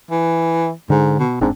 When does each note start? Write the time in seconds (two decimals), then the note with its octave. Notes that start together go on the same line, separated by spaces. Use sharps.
0.11 E3
0.90 G#2 D3
1.19 B2
1.41 F1 G#2 C4 D4